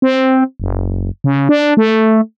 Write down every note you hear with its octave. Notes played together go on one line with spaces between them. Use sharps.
C4
F#1
C#3
D4
A3